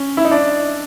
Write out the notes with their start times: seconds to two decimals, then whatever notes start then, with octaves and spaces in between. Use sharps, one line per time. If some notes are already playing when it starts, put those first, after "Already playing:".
Already playing: C#4
0.17 E4
0.25 D#4
0.31 D4